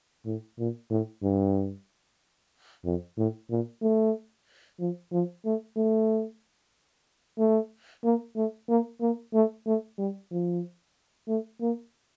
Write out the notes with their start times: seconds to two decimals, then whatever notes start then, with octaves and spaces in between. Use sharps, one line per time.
0.26 A2
0.59 A#2
0.90 A2
1.23 G2
2.85 F2
3.17 A2
3.50 A#2
3.82 A3
4.79 F3
5.12 F3
5.45 A3
5.77 A3
7.39 A3
8.04 A#3
8.36 A3
8.69 A#3
9.01 A#3
9.34 A3
9.66 A3
9.98 G3
10.32 F3
11.28 A3
11.61 A#3